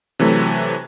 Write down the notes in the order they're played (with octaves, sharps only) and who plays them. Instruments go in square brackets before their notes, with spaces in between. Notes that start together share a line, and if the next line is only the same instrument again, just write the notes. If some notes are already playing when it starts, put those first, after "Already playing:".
[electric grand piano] C3 E3 F#3 A3